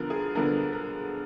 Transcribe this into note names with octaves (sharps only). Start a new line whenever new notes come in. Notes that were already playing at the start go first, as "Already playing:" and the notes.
Already playing: D3 F3 B3 D4 A#4
G#4
D3 F3 B3 D4 A#4
A#4